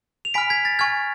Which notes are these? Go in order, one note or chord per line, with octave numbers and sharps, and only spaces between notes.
F7
G#5 B5 F6 B6 D7
G#6 B6
A6
G#5 C#6 F6 G#6